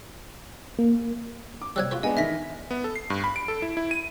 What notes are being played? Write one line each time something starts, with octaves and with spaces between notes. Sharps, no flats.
A#3
D6
C3 F#3 G3 E6 F#6 G#6
F4 F#4 B4
G#3 B3 D4 D#5 G#5
D#3 E3 E5 A#6 B6
B3
A4
C7
G2
B5
D7
A4
E4
E4
D#7